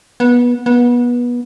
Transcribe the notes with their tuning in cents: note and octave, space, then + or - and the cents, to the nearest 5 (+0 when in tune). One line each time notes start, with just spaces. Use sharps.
B3 -20
B3 -25